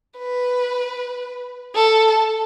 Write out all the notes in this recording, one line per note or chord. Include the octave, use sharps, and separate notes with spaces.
B4
A4